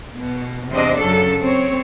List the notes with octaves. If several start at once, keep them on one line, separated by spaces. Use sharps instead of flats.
B2
E2 C3 C4 D4 D#5
F#2 C#3 F#3 A4
C4 C#5